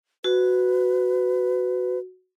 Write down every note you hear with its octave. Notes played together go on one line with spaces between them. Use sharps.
F#4 B4